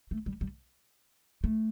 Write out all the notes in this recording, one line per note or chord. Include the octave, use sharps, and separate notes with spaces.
A3
G3
G3
A3